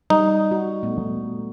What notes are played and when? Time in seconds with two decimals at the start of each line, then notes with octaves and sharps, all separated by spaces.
0.10 G3 D#4
0.51 F#4
0.83 A#2 A3 B3